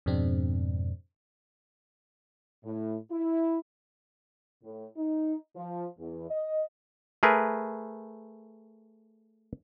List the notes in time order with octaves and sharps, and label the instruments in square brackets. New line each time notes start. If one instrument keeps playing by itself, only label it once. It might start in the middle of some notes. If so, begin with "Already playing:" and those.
[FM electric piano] F2 G#2 B2 G#3 C4 D4
[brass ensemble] A2
E4
[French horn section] A2
D#4
F3
E2
D#5
[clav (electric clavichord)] A3 G#4 A#4 B4